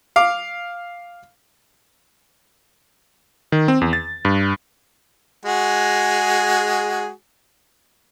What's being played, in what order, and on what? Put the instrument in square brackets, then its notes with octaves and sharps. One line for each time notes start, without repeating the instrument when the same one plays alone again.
[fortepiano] F5 D6
[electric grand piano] D#3
C4
E2
A6
G2
[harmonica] G#3 F#4 G#4